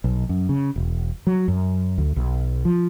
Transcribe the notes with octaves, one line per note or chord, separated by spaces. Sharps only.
B1
F#2
C#3
E1
F#3
F#2
D2
B1
F3